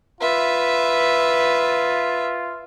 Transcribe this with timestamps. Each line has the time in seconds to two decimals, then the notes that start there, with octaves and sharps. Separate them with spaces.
0.21 F4 B4 E5